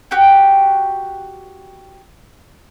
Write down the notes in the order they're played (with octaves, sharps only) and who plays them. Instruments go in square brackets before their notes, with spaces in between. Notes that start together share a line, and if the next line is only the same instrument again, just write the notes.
[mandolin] F#4 G4 G5